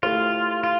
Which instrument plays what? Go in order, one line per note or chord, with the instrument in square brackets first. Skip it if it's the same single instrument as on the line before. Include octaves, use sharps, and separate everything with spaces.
[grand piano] A3 E4 G4 C5 [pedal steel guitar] F4
[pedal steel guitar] F4